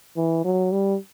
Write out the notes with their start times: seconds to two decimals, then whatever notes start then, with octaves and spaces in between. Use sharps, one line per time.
0.17 E3
0.44 F#3
0.72 G3